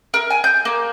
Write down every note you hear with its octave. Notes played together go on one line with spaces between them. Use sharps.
A#4
G#5
G6
A#3